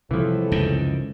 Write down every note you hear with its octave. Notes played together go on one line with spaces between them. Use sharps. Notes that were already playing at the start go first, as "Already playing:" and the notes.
A2 C3 E3 F3 G3 G#3 A4
C#2 F#2 D#3